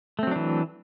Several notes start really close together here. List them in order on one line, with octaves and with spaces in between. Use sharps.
A3 C4 F#3 D4 E3